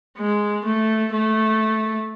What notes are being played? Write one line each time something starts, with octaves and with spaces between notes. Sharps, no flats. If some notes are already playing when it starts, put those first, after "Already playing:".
G#3
A3
A3